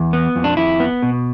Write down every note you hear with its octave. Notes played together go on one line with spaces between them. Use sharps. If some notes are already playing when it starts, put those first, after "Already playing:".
Already playing: E2
B3
F2
D4
F2 E4
B3
B2